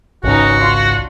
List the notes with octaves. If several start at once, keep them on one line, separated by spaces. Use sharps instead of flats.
G#1 C#2 C#4 D#4 F#4
D4 F4